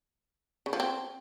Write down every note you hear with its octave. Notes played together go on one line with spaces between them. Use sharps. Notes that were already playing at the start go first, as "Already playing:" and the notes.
C#3
F3
C4